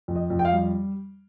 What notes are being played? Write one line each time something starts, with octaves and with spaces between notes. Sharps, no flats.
F2
D#5
F2
G5
F5
G3